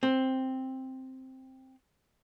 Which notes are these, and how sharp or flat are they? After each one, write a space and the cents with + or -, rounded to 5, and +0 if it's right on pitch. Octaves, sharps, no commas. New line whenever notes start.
C4 +5